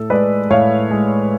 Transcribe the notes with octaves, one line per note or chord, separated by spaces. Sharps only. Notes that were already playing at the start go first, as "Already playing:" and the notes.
Already playing: A2 A4
G#3 B4 D5
A2 C#5 F5
G#3